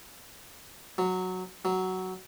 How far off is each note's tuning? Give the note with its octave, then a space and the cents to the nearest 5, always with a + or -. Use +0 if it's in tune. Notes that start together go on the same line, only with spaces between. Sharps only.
F#3 -5
F#3 +10